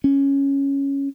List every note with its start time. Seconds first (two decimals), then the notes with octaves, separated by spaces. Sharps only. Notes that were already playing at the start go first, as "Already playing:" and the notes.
0.04 C#4